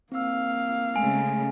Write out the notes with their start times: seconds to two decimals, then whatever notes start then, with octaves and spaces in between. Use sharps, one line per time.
0.12 A#3 C4 F5 E6
0.96 C#3 G#3 A3 G#5